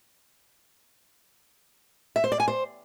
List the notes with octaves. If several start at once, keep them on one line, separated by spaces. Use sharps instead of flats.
E5
C5
D5
G#5
C5